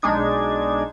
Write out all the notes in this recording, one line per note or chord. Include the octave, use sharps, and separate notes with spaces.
B1 G#3 D4 D#4 G#6